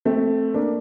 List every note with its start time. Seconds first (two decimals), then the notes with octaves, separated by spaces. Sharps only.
0.05 A3 C4
0.54 A#3 D4